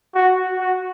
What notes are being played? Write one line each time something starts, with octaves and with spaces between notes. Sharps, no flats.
F#4
F#4